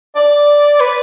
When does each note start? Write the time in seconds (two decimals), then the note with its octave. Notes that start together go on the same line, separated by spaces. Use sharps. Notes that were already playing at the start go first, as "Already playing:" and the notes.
0.16 D5
0.80 B4